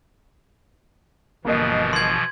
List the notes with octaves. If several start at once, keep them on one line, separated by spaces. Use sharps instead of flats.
G1 B2 E3 F3 A#3 D#5
C6 G#6